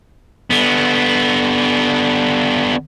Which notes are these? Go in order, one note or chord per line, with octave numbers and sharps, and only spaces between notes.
D3 B3